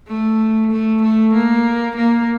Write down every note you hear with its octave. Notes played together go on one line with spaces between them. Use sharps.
A3
A3
A3
A#3
A#3